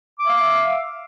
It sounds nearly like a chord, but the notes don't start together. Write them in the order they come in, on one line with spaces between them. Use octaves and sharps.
D6 E5 F5